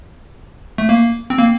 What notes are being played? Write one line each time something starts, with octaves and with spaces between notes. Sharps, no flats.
A3
A#3
C4
A#3